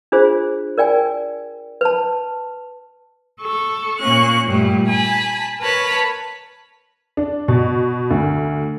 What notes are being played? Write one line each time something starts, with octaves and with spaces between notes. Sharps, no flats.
D4 F4 G#4 C5
A#4 D5 G5 G#5
B4 A5
A4 C#6
A#2 A#3 C#4 C#6 F#6
G2 A#2 G3 A3
G#5 A5 B5
A#4 B4 C#5 A5 B5
D4
B2
D2